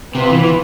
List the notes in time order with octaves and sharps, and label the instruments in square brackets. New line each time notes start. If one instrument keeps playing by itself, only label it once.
[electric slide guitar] C3 [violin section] B3 F4 B4
[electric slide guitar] E3
E3